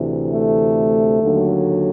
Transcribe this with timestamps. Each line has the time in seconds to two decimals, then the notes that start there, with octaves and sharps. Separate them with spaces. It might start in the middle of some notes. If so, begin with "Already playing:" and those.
Already playing: D2 C3 E3
0.29 A3
1.22 D#2 D3 F#3